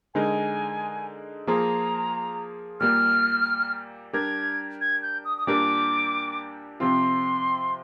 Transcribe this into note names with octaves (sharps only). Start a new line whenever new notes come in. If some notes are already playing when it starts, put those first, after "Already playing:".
D3 G#3 D#4 A#4 G#5
F3 A#3 F4 G#4 A#5
A#2 G3 A#3 F6
G3 D4 G4 A#4 G#6
G#6
G6
D#6
D#6
A#2 G3 D4 G4 A#4 D6
C3 F3 C4 F4 C6